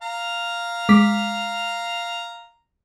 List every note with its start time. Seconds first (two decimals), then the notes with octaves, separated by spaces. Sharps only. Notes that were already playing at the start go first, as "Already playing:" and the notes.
0.02 F5 A#5
0.89 G#3 D6 B6